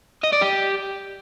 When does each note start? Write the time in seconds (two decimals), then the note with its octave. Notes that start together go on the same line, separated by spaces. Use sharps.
0.23 D#5
0.32 D5
0.41 G4